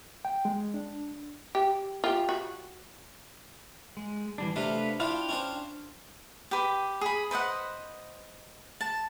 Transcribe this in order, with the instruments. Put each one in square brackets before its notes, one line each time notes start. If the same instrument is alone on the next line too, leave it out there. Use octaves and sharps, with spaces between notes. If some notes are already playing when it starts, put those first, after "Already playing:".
[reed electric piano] G5
G#3
D4
[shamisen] G4
F4 G4
F#4
[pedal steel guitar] G#3
E3 G3 D4
[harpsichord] C3 D4 [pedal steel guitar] A3 B4 F5
[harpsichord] D4 E4 F4 [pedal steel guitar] F5 G5
[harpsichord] C#4 D4 C5
[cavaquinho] G4 B4
G#4 B5
B4 C5 D#5 F#5
A5